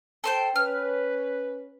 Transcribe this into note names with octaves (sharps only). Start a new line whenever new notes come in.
A4 C5 G5
C#4 B4 F6